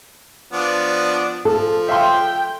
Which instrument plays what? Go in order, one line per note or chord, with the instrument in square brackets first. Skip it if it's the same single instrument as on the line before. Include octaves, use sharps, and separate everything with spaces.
[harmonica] F3 B3 D4
[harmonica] F3 [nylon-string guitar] A4
[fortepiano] E5 F5 C6 [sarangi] G5